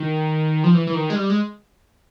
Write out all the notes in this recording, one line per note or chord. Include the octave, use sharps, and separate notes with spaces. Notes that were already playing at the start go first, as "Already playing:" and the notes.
Already playing: D#3
F3
E3
E3
D#3
G#3
G3
G#3